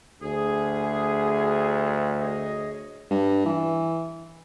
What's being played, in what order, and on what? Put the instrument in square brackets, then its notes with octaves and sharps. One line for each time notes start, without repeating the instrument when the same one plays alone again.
[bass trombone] D2 [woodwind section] G#4
[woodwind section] G#4 C#5 D#5
[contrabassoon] G2
E3